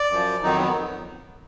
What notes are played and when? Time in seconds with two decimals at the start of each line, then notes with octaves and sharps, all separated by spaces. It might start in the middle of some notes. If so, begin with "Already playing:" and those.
Already playing: D5
0.11 F#2 F3
0.43 F2 D#3 F#3 D#4
0.58 B3